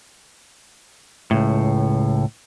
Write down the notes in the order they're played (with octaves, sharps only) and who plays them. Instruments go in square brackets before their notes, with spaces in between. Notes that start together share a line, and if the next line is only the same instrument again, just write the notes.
[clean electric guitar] C#2 A2